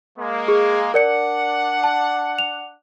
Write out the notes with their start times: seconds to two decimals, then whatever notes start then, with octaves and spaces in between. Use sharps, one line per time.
0.18 G#3 A#3
0.48 G#4
0.94 D4 A#4 D5 F#5 C#7
1.84 A5
2.39 F7